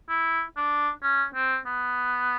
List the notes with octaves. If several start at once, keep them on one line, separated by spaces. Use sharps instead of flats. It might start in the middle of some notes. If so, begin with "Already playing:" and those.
E4
D4
C#4
C4
B3